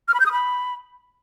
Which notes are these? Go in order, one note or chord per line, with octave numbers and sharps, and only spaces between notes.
F6
B5
G6
D#6
B5